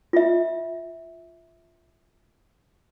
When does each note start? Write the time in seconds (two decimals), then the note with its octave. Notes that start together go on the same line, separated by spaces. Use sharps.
0.13 F4 E5